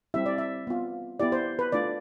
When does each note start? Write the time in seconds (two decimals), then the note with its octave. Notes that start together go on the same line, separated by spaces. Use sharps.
0.14 G3 C4 E4 G4 E5
0.26 D5
0.38 E5
0.67 B3 F4
1.20 B3 E4 G4 D5
1.32 C5
1.59 B4
1.72 A3 D4 F4 D5